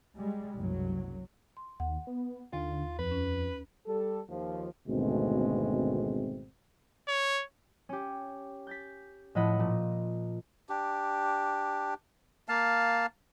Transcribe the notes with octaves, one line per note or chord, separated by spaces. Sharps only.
G3 G#3
F#1 C2 F#3
C6
D#2 F#5
B3
D#2 D3 F4
F2 B4
C#4
G3 A4
D#2 F3
G#1 D2 B2 G#3 A3 C4
C#5
C#4 G4
G6 A6 B6
A2 F3 A4 D#5 F#5 B5
A#2 F3
D4 G4
A#3 F5 A5